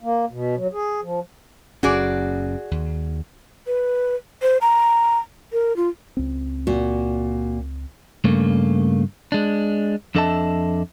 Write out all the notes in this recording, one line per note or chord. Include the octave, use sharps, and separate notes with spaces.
A#3
B2
F#3
G#4
F3
F#1 F#2 C#4 F#4 G#4 D5
D#2
B4
C5
A#5
A#4
F4
C#2 C4
A#2 F#4
G2 C#3 A3 A#3
G#3 D4
F2 D4 A4 D#5 E5 A5